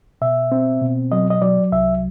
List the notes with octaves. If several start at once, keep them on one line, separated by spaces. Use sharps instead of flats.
B2 E5
C4
B2
F#3 D#5
D#5
F#3 D5
C2 E5